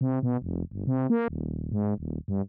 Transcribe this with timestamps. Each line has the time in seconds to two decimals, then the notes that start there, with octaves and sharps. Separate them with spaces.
0.01 C3
0.23 B2
0.42 F1
0.71 G1
0.87 C3
1.10 A#3
1.28 D#1
1.72 G#2
1.98 D#1
2.28 G2